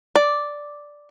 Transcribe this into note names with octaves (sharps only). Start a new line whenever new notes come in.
D5